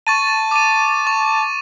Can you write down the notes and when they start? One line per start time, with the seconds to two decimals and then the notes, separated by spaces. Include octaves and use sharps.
0.07 A5 C#6 A6 D#7
0.51 D6 D#7
1.07 C#6